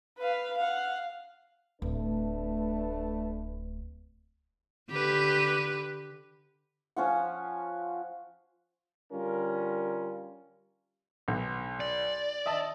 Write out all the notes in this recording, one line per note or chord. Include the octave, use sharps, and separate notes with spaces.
B4 F5
F5 F#5
D1 A3 D4 B4
D3 G4 B4
F3 C#4 F4 F#5
D3 G3 C#4 F4 A#4
B1
D5
D#5 E5 A5